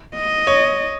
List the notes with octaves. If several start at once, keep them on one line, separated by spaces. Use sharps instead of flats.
D#5
C#5